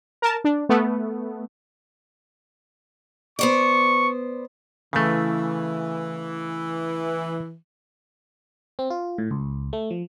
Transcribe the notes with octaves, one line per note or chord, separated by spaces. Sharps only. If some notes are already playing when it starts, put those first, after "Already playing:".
A#4 A5
D4
A3 B3
B3 C5 D5 C#6
C#3 E3 A3
C4
F4
A2
C#2
A3
F3